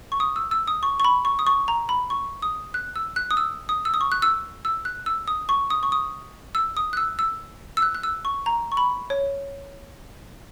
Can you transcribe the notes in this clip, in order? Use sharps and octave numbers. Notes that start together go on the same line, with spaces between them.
C#6
D#6
E6
E6
D#6
C#6
C#6
B5
C#6
D#6
C#6
A#5
B5
C#6
D#6
F#6
E6
F#6
D#6
E6
D#6
E6
D#6
C#6
F#6
E6
E6
F#6
E6
D#6
C#6
D#6
C#6
D#6
E6
D#6
F#6
E6
E6
E6
F#6
F#6
E6
C#6
A#5
C#6
B5
C#5